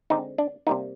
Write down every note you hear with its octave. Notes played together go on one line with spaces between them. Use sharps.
D3 G#3 C4 D#4
D4
C3 G3 A#3 D#4